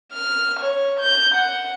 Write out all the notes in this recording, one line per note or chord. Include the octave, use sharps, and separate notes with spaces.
F6
C#5
G6
F#5